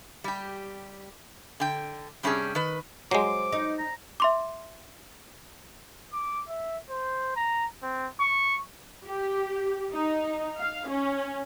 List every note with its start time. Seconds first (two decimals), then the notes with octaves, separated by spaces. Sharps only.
0.24 G3 G4
1.60 D3 G5
2.23 C3 G3 C#4 D4 G4 G#4
2.55 D#3 B4
3.11 F#3 G#3 C5 D6
3.52 D#4
3.79 A#5
4.20 E5 C6 D6
6.13 D6
6.49 E5
6.90 C5
7.36 A#5
7.83 C4
8.20 C#6
9.07 G4
9.93 D#4
10.59 F5
10.89 C#4